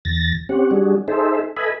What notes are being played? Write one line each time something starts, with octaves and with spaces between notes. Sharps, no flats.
E2 A6 A#6
C4 C#4 G4 F#5
G3 D4 F#4 G#4
D#4 G#4 A4 C5 E5
A4 B4 D#5 E5 G#5 B5